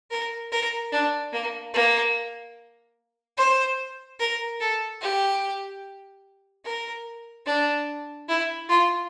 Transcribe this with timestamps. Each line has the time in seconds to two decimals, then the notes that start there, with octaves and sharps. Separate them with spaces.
0.10 A#4
0.52 A#4
0.92 D4
1.33 A#3
1.74 A#3
3.37 C5
4.20 A#4
4.60 A4
5.01 G4
6.65 A#4
7.46 D4
8.29 E4
8.69 F4